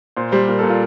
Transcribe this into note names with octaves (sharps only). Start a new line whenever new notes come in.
A#2 C5
G3 C5
A#2 A#4
A4
A#2
F4